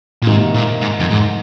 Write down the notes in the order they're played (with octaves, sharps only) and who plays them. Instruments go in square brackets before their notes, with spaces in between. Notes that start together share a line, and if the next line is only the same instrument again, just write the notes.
[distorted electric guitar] A#2
[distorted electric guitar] G#2 [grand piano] C3 D#3 A#3
[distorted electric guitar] A#2
G#2
F2
G#2